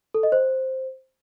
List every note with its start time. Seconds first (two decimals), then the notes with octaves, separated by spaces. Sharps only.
0.14 A4
0.23 D#5
0.32 C5